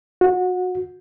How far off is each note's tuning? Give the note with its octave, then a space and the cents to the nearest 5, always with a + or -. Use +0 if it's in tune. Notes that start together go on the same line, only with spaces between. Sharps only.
F#4 -25